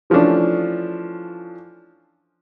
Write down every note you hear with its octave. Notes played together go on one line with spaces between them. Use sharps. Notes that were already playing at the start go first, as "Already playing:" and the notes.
E3 F3 A3 C#4 D4